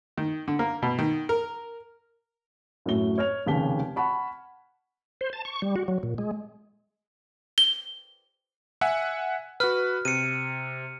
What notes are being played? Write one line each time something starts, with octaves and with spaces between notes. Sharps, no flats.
D#3
D3
A#3
B2
D#3
A#4
F#2 A2 A3 F#4 G7
C#5 F6 G#6 F7
F1 D#2 C#3 G4 B6 G7
F#5 A5 B5 C#6
C5
A5
C#6
G3
F#4
F#3
A#2
G#3
G7
E5 F#5 G#5
F#4 B4 F6
C3 C#7 D#7